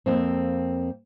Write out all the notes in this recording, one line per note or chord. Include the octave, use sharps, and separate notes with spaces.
F2 A#3 C4